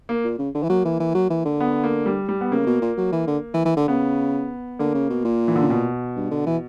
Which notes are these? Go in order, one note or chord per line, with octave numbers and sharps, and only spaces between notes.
A#3
A#2
C#3
D3
E3
F#3 A#3
E3
E3
F#3
E3
D3
B3
A#3
G3
G3
B3
C#3 A#3
B2
A#2
F#3
E3
D3
E3
E3
D3
C#3 B3
D3 A#3
C#3
B2
A#2
E3
D3
C#3
B2
G2
D3
E3